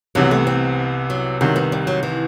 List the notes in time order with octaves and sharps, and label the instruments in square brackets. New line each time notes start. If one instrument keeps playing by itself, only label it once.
[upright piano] C2 C3 E3 B3 [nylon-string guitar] F#3
[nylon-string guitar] A3
C4
F#3
[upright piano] C2 C3 D#3 [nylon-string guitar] F#3
[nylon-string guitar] B3
G3
F#3
E3